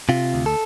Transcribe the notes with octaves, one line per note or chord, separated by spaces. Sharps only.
C3 F4
D2
A4